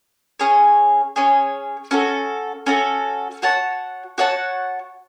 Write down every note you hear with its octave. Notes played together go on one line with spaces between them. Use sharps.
C#4 G#4 C#5
C#4 G#4 C#5
C#4 F#4 A4
C#4 F#4 A4
F#4 C#5 F#5 A5
F#4 C#5 F#5 A5